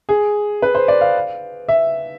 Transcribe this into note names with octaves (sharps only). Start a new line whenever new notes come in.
G#4
B4
C5
D5
F5
E5